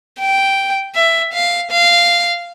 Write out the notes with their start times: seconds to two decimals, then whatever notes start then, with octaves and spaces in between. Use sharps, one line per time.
0.19 G5
0.95 E5
1.33 F5
1.71 F5